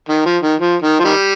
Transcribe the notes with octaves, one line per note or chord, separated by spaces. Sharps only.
D#3
F3
D#3
F3
D#3
F3
D#3 G3